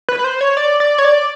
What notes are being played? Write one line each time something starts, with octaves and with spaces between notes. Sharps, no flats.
B4
B4
C5
C#5
D5
D5
C#5
D5